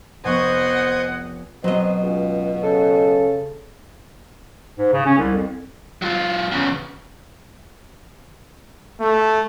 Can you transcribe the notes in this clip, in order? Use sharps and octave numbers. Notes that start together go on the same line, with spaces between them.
F1 B3 C5 D#5 F#5 G#5 C#6
B2 F#3 C4 D#5
C#2
C#3 A4
G#2
C#3
C#4
C2
F2
F#3 F4
E2 C#3
A3